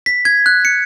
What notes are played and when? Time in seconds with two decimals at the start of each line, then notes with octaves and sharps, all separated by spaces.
0.06 B6
0.25 G#6
0.46 F#6
0.65 C#7